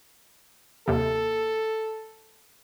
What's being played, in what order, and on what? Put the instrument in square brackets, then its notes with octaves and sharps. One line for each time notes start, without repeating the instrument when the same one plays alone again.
[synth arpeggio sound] D#2 C3 [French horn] A4